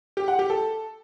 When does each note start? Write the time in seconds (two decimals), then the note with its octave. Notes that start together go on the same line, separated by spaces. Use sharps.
0.17 G4
0.28 F#5
0.39 G4
0.50 A4